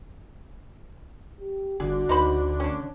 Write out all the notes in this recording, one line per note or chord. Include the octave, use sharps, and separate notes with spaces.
G4
G1 D3 F#4 G#4
D2 D#4 C5 B5
C#4 D4